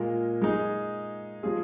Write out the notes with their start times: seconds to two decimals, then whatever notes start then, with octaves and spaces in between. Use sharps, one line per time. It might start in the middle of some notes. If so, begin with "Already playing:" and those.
Already playing: A#2 G#3 F4 A#4
0.42 G#3 D#4 G#4
1.43 F3 G#3 F4 G#4